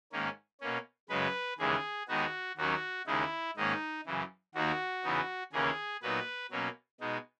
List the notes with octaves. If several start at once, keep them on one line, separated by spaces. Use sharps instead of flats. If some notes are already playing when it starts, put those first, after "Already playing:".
G#2 D#3 A#3 C#4
B2 A#3 C#4
F#2 C#3 G#3 B4
D#2 C#3 E3 G#3 G#4
D#2 D#3 G#3 B3 D#4 F#4
D#2 D#3 F#3 C#4 F#4
D#2 C#3 G#3 D#4 E4
G#2 D#3 A#3 C#4 D#4
F#2 C#3 E3
D#2 D#3 A#3 F#4
E2 C#3 E3 B3 D#4
D#2 C#3 E3 A#3 C#4 G#4
A#2 F#3 B3 D#4 B4
B2 F#3 A#3 C#4
B2 G#3 D#4